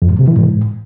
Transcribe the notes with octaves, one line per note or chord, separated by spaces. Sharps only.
F2
G#2
C3
E3
G#2